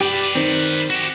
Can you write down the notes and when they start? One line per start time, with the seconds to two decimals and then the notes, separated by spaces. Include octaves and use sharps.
0.01 G4 B4 D5
0.35 D#3 C4
0.90 F#4 G4